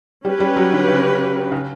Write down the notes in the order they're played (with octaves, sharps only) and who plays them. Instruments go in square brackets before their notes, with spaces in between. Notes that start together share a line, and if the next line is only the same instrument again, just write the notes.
[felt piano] G3 [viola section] C#4 G4 B4
[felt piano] G3
F#3
D3
C#3
C#3